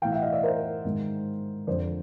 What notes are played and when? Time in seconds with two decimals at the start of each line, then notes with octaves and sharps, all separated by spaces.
0.02 E3 F5 G5
0.05 A2
0.12 E5 F#5
0.22 D#5 F5
0.33 D5 E5
0.43 A#4 C5
0.85 G#2 D#3
1.67 F2 D3 C5 D5